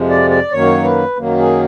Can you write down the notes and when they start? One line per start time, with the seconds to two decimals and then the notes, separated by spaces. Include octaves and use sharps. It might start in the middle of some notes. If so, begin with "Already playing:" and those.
Already playing: F2 C3 F3 G#3
0.10 D5
0.30 D5
0.52 F#2 D#3 F#3 A#3 C#5
0.84 B4
1.16 F#2 D#3 F#3 A#3
1.39 G#4